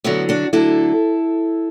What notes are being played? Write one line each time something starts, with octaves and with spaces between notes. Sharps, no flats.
D2 D3 F#3 B3 E4
D4 F#4
D2 D3 F#3 E4 A4